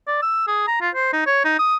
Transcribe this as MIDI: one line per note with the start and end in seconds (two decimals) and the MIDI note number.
0.07 0.19 74
0.22 0.47 88
0.48 0.64 68
0.67 0.80 82
0.81 0.90 65
0.95 1.11 72
1.13 1.23 63
1.27 1.41 73
1.45 1.58 63
1.59 1.76 87